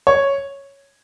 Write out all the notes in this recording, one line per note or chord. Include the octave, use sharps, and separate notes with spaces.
C#5